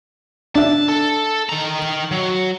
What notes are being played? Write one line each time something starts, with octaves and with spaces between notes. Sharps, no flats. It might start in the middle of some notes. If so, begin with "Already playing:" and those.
D4 E5 A5
A4
D#3 A#5
F#3